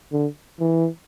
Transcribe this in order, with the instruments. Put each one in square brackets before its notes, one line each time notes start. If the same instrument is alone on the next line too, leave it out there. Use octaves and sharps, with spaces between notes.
[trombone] D3
E3